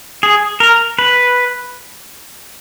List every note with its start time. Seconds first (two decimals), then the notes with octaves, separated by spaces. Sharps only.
0.23 G#4
0.60 A#4
0.99 B4